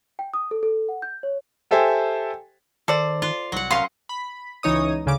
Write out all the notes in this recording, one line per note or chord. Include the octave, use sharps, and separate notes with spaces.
G5
D#6
A4
A4
F#5
G6
C#5
G4 A4 C5 E5 G5 G#5
D#3 A4 C5 D5
F4
C2 F#3 F#5
C#4 A#4 F5 C6
B5
C#2 E3 D#4 C#5 D#6
D2 C#3 D6